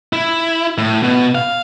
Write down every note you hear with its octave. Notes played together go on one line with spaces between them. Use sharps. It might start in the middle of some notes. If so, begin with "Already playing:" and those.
E4
A2
B2
F5